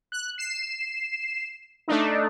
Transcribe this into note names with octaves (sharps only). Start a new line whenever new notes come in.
F#6
C7 E7
A3 D4 D#4